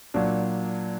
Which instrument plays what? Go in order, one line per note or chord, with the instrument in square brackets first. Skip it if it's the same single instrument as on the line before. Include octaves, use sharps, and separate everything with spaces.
[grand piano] A#2 F#3 D4